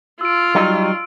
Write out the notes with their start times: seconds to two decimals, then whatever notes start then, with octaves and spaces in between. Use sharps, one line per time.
0.21 F4 E6 D7
0.55 F#3 G3 D#4